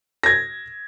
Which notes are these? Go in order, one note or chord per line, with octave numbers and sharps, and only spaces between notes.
G#6 A#6